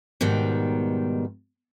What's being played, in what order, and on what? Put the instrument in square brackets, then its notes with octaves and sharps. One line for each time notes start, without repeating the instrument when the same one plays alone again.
[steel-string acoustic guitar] G#2 B2 D#3 G3